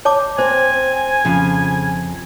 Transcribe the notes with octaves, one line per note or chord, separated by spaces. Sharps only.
C#5 A5 D6
C4 C5 G#5
F2 C#3 F3